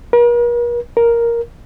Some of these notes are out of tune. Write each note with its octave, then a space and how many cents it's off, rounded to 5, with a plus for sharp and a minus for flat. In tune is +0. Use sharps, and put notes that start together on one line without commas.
A#4 +45
A#4 +5